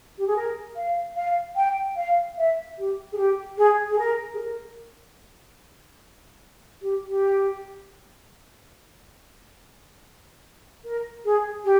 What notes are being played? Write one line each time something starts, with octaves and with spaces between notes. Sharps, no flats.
G4
G#4
A#4
F5
F5
G5
F5
E5
G4
G#4
G4
G#4
G#4
A#4
G#4
A#4
G4
G4
A#4
G#4
G4